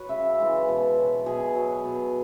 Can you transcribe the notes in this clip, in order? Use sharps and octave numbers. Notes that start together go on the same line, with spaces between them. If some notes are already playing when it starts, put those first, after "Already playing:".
Already playing: F#3 B4 C#5
C#3 E5
E3 G#3
B2
F#3
B2 G#4
F#3
B2